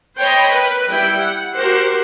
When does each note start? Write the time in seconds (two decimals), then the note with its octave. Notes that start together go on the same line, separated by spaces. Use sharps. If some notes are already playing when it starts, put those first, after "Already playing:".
0.19 C5 C#5 D#5 G5 B5
0.50 A#4 B4
0.88 G3 E4 G5
1.21 F#5
1.55 F#4 G4 A#4 C5